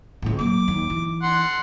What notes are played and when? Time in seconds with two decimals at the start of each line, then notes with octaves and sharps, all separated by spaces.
0.22 C#2 A2
0.39 F#3 A#3 D6
0.68 D#2
0.90 E3
1.23 F#5 C6